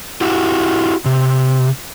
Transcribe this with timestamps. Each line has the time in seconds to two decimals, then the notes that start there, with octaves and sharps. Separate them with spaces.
0.21 E4 F#4 G4
1.05 C3